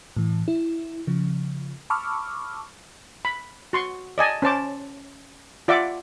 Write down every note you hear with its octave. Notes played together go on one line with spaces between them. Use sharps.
A2 E3
E4
C#3 F3
A5 B5 C#6 D6 E6 F6
B5
F#4 C6 C#6
D5 D#5 G#5 A5
C#4 C5 A5 D6
F4 D5 E5 F#5 D6